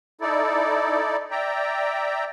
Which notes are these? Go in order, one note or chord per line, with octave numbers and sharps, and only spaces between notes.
D#4 E4 A4 D5
D5 E5 G5 A#5